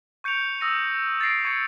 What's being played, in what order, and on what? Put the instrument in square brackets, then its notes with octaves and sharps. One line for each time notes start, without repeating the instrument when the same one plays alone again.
[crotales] C#6 G6 C#7 D7 F7
D#6 E6 A#6 D#7
A6 A#6 C7 D7
C#6 G#6 C#7